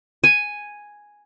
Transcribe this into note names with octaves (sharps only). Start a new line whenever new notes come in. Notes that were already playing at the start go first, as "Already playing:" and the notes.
G#5